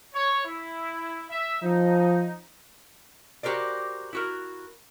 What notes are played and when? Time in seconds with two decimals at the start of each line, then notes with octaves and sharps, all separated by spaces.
0.14 C#5
0.45 E4
1.30 E5
1.62 F3 D#4
3.43 F#4 G4 A#4 C5 D5
4.13 E4 F#4 A#4